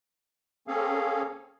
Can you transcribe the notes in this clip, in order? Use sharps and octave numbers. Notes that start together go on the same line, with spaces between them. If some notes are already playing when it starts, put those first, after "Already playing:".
A#3 C4 C#4 G#4 A4 F5